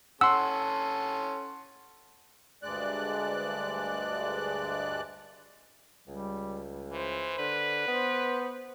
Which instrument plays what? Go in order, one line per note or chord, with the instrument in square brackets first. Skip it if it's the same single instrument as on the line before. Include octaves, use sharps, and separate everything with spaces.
[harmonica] C#4 A4 [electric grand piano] F#5 C6 [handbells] E6
[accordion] D2 G2 G#3 D5 F#6
[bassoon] C#2 [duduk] G3
[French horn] E3 [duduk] C5
[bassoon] D3 [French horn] B4
[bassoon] B3 [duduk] C5